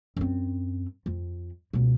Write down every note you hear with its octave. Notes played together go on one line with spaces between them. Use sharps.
F#2 C4
F2
C#2 B2